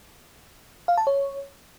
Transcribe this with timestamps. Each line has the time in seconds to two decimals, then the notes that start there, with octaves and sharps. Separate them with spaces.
0.88 F5
0.97 A5
1.07 C#5